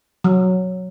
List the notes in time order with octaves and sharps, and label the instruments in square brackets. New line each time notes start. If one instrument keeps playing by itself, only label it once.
[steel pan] F#3